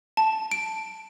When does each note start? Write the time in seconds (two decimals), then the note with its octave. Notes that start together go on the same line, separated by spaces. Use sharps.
0.17 A5
0.51 D7